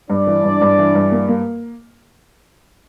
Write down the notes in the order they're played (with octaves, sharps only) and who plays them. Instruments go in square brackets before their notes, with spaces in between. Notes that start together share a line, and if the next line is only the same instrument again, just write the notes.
[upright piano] G2 [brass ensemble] D4 D5
[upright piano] E3
G2
G2
E3
G2
A#3
A#3